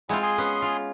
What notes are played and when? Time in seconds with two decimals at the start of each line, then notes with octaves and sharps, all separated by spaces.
0.09 G#3 C4 E4 F4 F#5 G#5
0.23 G#4 G#5 C6
0.38 B3 C#4
0.62 F4